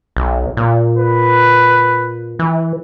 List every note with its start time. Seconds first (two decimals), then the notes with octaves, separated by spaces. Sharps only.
0.17 B1
0.57 A#2
0.96 B4
2.39 E3